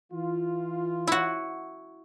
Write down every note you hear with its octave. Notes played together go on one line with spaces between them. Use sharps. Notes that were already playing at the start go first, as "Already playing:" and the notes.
E3 F4
E4 F#4